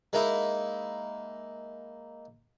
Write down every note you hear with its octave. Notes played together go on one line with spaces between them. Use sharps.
G#3 A#3 D#4 E4